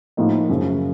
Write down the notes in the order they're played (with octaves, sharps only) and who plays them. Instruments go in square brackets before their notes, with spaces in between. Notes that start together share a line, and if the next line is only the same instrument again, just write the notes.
[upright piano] A2 F3 A#3 D#4
F#2 C#3 F3